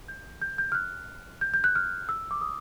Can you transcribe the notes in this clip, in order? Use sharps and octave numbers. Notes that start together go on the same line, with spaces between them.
G6
G6
G6
F6
F#6
G6
G6
F#6
F6
E6
D6
D#6